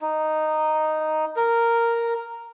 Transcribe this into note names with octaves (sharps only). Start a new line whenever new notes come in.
D#4
A#4